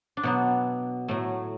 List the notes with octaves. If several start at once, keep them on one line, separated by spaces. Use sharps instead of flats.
D4
B2 F#3 B3
A2 F#3 A3